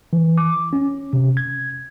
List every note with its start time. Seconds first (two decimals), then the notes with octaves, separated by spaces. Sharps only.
0.13 E3
0.37 D6
0.73 C#4
1.13 C3
1.37 G#6